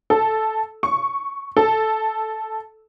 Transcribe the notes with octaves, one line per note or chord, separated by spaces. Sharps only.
A4
C#6
A4